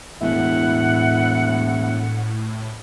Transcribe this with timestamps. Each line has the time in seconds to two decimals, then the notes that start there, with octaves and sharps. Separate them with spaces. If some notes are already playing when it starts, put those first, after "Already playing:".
0.21 E1 A2 E4 F#5